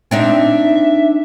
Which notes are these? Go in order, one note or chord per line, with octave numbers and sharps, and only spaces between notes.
C4 D4 D#4 E5